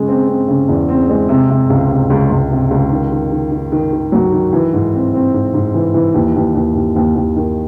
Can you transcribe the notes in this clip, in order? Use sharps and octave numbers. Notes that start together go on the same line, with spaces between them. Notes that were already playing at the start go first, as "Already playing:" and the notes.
Already playing: C#3 G#3
C4
C4
C#3
E2
C4
G#3
C3
C3
C#2
C3
C#2
C#2
C3
C#2
D#3
D#3
D#3
D#3
D#3
D#3
F#3
D#3
E3
G#2
C4
C4
G#2
G#2
E3
E3
D#2
D#2
D#2
D#2
D#2
D#2
D#3